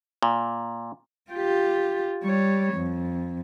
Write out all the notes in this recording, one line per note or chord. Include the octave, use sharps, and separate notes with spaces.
A#2
F4 G4
G3 C#5
F2